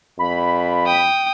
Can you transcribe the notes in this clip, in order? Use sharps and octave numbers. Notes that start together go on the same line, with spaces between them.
F2 B5
G5 D#6